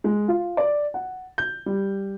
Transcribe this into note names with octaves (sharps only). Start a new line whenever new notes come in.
G#3
F4
D5
F#5
G6
G3